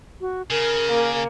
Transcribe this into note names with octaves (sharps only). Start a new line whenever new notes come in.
F#4
C#3 A#4
A#3